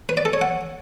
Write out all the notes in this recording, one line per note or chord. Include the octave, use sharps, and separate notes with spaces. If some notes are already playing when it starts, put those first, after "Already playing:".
B4
D5
A4
C#5
F#5